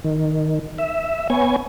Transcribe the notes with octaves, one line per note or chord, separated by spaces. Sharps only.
D#3
E5
B3 C#5 G#5